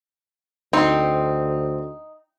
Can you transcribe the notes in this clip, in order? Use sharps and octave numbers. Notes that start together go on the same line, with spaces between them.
D2 C4 D#4 C6